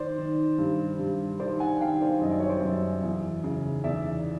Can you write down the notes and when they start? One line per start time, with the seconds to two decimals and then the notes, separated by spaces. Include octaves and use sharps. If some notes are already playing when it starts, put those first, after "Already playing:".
Already playing: D#3 C5 D5
0.18 D#3
0.58 G2
0.99 G2
1.40 D#3 C5 D5
1.60 F#5 G#5
1.80 D#3 F5 G5
2.01 C5 D5
2.21 F#2 D#5
2.31 D5
2.40 C#5
2.49 C5 D5
2.63 F#2
3.03 E2
3.44 C#3
3.84 E2 D5 E5